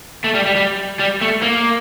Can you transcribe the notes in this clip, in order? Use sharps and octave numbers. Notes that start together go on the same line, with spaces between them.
A3
G3
G3
G3
G3
A3
A#3